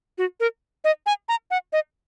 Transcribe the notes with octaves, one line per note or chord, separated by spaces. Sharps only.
F#4
A#4
D#5
G#5
A#5
F#5
D#5